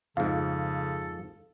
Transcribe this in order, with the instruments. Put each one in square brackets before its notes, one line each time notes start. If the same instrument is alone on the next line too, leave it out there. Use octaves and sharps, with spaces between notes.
[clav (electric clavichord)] F2 G#2 [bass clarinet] C#3 [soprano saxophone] A4 [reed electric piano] F5